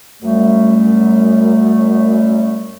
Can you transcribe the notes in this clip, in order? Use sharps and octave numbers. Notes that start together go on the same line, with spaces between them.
F#2 G3 A3